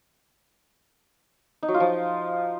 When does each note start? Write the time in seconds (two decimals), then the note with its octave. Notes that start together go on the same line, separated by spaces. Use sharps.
1.63 D#4
1.68 F#3
1.74 F4
1.80 F3